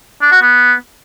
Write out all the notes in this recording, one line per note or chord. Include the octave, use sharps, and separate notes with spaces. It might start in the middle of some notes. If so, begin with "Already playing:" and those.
D4
F#4
B3